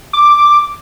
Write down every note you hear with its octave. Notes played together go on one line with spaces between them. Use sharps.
D6